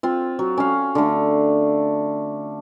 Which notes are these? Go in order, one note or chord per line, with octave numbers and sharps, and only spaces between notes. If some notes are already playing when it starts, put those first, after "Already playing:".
C4 F4
F#3
C#4 F5
D3 A3